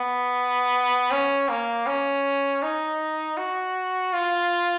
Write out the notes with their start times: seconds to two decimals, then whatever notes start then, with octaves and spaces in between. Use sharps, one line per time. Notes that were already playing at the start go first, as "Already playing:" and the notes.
Already playing: B3
1.11 C#4
1.49 A#3
1.86 C#4
2.63 D#4
3.37 F#4
4.13 F4